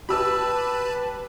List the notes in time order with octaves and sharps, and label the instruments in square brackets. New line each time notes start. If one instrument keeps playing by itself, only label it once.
[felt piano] G4 E6 [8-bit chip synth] B4 A5 B5